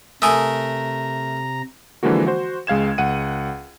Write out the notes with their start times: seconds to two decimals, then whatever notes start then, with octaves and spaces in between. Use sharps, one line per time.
0.22 C3 A3 A#4 G#5 A#5 D#6 E6
2.03 D3 E3 F3 G#3 A#3 F#4
2.27 F#4 C5
2.67 C#2 G#3 F5 G#6 E7
2.98 C#2 F#5 D#7